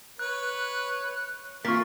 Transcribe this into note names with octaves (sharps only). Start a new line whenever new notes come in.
B4 C#5 F#6
E3 A#3 F4 C#6 F6 A6 B6